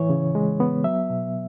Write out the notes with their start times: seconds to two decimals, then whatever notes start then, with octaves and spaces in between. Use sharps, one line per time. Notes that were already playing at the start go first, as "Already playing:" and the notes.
Already playing: A2 E3 C#5
0.10 C#3
0.35 G#3
0.60 B3
0.84 F#3 E5
1.10 B2